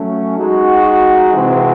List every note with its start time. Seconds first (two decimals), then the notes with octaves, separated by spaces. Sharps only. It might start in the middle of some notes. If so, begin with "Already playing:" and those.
Already playing: F#3 A3 C#4
0.37 G#3 D#4 F#4
1.34 C3 E3 G#3 C4 F#4